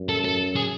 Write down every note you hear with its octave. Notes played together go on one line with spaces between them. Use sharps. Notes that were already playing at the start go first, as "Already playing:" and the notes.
Already playing: F#2
A4
A4
G#4